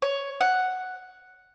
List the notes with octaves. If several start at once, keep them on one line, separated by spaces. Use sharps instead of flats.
C#5
F#5